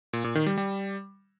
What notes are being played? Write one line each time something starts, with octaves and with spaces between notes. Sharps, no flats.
A#2
A#2
D#3
G3
G3